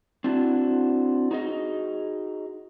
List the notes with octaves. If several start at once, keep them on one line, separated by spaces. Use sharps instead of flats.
C4 D4 E4 F#4
D#4 F#4 G#4 D5 D#5